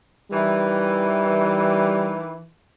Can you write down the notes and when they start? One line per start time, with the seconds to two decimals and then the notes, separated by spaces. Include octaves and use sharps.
0.31 D#3 E3 G3